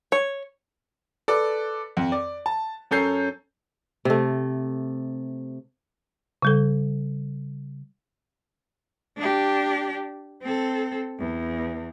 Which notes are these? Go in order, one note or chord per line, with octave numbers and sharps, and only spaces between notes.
C#5
A4 B4 D5
F2
D5
A5
F#2 C#4 A4 C#5 G6 C7
C3 A3
C#3 G3 A4
D4 G4
C4 A4
E2